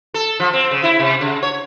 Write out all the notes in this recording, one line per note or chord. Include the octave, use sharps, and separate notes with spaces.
A4
F3
C4
C#3
E4
C3
C#3
C#5